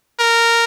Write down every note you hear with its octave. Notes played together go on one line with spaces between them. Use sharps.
A#4